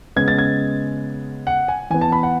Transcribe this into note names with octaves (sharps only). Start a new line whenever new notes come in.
C#3 G#3 B3 G#6
A6
G#6
F#5
G#5
E3 B3 G#5
A5
B5
F#5